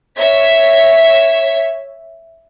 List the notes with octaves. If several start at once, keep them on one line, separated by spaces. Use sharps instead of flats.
C#5 E5 B6